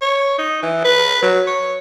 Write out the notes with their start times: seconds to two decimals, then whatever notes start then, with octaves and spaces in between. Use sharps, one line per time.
0.02 C#5
0.39 D#4
0.62 E3
0.85 B4
1.23 F#3
1.47 C#5